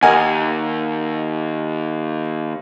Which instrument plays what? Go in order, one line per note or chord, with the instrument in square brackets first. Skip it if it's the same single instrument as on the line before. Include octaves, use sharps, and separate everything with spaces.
[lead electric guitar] D#2 [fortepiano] A#4 D#5 G#5 [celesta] F#5